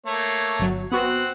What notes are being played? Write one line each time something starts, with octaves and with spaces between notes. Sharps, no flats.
A3 A#3 C#5
G1 F#3
B3 C4 F#4 F#5